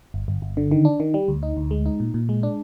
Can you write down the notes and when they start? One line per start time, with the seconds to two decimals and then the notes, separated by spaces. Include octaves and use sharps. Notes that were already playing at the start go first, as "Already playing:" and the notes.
0.14 G1
0.28 G1
0.42 G1
0.57 D3
0.71 D#3
0.85 D4
1.00 D#3
1.14 G3
1.28 D2
1.43 D#4
1.57 D2
1.71 G#3
1.86 D#4
2.00 A#2
2.14 A#2
2.29 G#3
2.43 D4